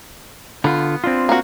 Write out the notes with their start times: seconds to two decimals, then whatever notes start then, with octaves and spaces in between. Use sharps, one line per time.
0.64 D3 B3 F4
1.04 C4 D4 F4
1.29 A#3 F#4